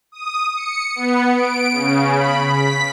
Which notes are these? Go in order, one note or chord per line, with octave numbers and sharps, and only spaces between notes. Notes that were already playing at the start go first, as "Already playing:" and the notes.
D#6
C#7
B3
D7
C#3
B5
B6